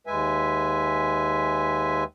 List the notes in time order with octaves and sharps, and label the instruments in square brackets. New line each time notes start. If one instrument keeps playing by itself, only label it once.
[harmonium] D#2 G#3 B4 E5 G#5